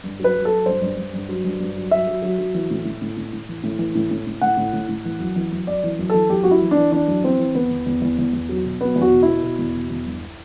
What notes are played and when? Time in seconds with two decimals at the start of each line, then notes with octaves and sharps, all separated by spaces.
0.04 G2
0.20 F#3 B4
0.35 F#3
0.45 A4
0.50 F#3
0.66 G2 C5
0.82 G2
0.97 G2
1.14 G2
1.29 F#3
1.45 G2
1.60 G2
1.76 F#3
1.91 F#3 E5
2.07 F#3
2.22 F#3
2.38 F#3
2.54 E3
2.70 A2
2.85 A2
3.02 A2
3.17 A2
3.33 A2
3.49 E3
3.63 A2
3.79 E3
3.95 A2
4.11 A2
4.27 A2
4.41 A2 F#5
4.57 A2
4.73 A2
4.88 A2
5.05 E3
5.20 F#2
5.36 E3
5.52 F#2
5.67 F#2 D5
5.83 E3
5.99 F#2
6.10 E3 A4
6.29 F#2 G4
6.44 F#2 F#4
6.51 E4
6.62 E3
6.71 D4
6.77 E3
6.92 E3 D4
7.08 F#2
7.24 E3 C4
7.39 E3
7.55 E2 B3
7.71 E2
7.87 E2
8.02 E2
8.19 E2
8.33 E2
8.49 F#3
8.65 B2
8.81 F#3 B3
8.96 E2
9.02 F#4
9.12 B2
9.23 E4
9.28 B2
9.43 B2
9.59 E2
9.75 B2
9.90 E2
10.06 G2